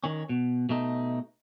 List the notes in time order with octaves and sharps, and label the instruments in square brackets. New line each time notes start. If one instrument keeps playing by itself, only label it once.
[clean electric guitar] D#3 C#4
B2
B2 A3 D#4